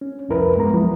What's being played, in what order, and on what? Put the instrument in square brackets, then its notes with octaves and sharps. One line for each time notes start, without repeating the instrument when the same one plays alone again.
[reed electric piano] C#4
C2 F2 F3 E4 A#4 B4
G2 G#3 B3 A#5
F3 F#3 B3 E4